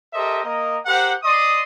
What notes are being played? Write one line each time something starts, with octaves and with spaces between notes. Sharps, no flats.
G4 A4 A#4 C5 D#5 E5
A#3 A#4 D#5
G4 A#4 C5 F#5
D5 D#5 C6 D#6